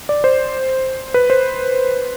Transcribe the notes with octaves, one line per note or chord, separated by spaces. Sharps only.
D5
C5
B4
C5